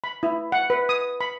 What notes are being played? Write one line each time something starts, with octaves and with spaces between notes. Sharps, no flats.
B5
E4
F#5
B4
D#6
B5